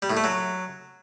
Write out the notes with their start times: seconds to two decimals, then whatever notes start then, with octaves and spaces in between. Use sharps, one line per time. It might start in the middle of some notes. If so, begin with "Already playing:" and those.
0.02 G3
0.10 A2
0.17 A3
0.24 F#3